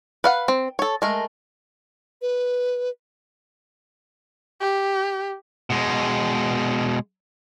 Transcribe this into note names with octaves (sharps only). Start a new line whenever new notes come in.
B4 F5 F#5
C4
A4 C#5
G#3 A3 A#4
B4
G4
B2 G#3